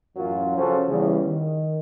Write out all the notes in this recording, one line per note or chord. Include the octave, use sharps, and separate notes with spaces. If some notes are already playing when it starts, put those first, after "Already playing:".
A1 F#2 F#3 C#4 F4
C#3 F3 C#4 F#4 A4 C5
E2 C#3 G3
D#3